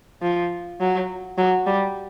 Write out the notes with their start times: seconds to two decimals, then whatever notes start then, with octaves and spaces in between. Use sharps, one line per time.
0.22 F3
0.81 F#3
1.38 F#3
1.67 G3